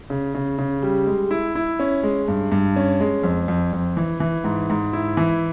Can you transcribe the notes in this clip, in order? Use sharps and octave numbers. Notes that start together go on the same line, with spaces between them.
C#3
C#3
C#3
G3
G#3
E4
E4
C#4
G#3
G2
G2
C#4
G#3
F2
F2
F2
E3
E3
G#2
G#2
E4
E3